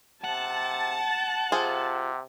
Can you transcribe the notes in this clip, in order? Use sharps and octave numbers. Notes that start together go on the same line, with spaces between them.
C3 F#5 A5
C3 F4 G#4 C5